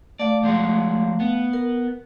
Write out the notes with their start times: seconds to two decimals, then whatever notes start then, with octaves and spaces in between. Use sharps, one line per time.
0.19 A3 D5 F5
0.43 F3 G#3 F#4
1.20 B3
1.53 A#4